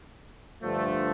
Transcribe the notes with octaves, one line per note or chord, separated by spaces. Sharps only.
G2 D3 F3 A3